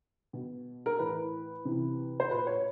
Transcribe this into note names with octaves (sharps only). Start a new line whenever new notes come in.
B2
A#4
A2 E3 B4
C3 E3
C5
A#2 B4
C#5